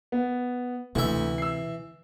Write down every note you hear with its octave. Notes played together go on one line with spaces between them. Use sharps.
B3
D2 C3 E3 E5
E6 C7